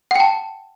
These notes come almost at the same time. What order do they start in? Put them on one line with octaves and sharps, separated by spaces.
F#5 G5 A5